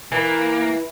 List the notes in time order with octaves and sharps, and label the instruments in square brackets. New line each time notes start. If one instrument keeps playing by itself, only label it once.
[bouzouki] E3 [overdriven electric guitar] A#3